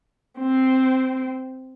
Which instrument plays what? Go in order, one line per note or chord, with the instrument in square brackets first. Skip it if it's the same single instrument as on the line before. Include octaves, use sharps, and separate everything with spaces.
[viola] C4